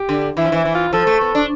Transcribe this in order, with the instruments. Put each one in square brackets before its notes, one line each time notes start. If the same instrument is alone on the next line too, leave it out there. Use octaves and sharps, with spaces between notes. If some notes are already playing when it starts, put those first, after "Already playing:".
Already playing: [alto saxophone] G4
[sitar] D3
[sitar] E3 [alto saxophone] E4
[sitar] F3
[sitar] E3 [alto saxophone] E4
[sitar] E3
[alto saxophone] F4
[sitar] F3 [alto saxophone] A4
[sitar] A3
B3
D4